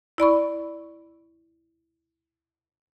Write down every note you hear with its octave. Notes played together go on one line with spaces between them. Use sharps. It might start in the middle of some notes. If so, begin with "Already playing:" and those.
E4 D5 B5 C#6